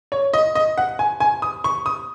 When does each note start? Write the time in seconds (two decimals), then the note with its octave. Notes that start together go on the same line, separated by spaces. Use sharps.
0.12 C#5
0.33 D#5
0.55 D#5
0.78 F#5
0.99 G#5
1.20 G#5
1.42 D#6
1.64 C#6
1.86 D#6